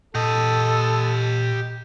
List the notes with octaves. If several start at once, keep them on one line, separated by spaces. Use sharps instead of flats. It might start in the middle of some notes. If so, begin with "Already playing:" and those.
A#2 G4 A4 D#5